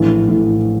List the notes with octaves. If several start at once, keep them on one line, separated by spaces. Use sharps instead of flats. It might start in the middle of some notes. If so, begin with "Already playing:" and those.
Already playing: A#1 A2 E3
A2 E3